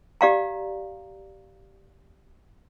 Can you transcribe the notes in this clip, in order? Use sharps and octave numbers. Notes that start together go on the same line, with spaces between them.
G4 D5 F5 A#5